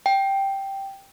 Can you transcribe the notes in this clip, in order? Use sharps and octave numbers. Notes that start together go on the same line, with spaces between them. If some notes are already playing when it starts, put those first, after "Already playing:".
G5